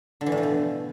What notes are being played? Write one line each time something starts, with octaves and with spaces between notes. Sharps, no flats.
D3
E3
A2
F3
B2